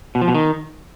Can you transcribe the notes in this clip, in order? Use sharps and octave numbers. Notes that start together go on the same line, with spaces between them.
B2
F3
B2
D#3